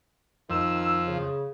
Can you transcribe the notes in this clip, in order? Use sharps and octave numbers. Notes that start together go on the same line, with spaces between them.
F2 D#3 F3 E6
C#3